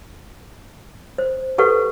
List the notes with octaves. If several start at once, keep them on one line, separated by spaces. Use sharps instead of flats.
C5
G4 A4 B4 F#5 C#6